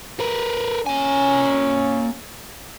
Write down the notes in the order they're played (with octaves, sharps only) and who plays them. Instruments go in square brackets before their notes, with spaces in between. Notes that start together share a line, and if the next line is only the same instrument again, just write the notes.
[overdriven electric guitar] A#4 B4
[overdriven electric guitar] A#3 G#5 [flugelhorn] C#4